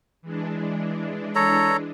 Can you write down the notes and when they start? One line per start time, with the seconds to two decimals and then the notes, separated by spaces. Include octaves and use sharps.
0.22 E3 G#3 D4
1.35 A4 C#5 A#5